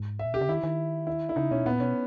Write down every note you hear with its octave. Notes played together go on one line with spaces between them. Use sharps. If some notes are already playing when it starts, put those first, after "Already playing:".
Already playing: G#2
E5
A#2
B2 G4
C#3
D#3 E4
D#3
E4
E4
C#3 D#4
B2 C#4
A#2 B3
B2 C#4